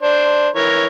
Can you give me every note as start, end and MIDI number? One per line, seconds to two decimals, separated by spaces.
0.02 0.48 62
0.02 0.48 72
0.55 0.86 52
0.55 0.86 70
0.55 0.86 73